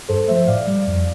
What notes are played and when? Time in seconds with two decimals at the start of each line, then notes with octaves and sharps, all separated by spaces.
0.09 G2 A4 C5
0.28 F3 A3 C5 E5
0.47 A2 D5 F5
0.67 G3
0.87 F2